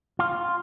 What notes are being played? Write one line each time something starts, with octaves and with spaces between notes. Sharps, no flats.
F4